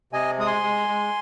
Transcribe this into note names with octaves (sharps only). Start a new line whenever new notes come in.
C3 D#5 G#5
G#3 D#6
G#5 C6
G#3
G#3